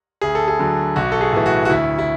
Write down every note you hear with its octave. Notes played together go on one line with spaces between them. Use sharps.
D2 G#4
A4
G#4
D3 F#3
B1 F#4
A4
G#4
A2 E3
F#4
F#4
D2 E4
E4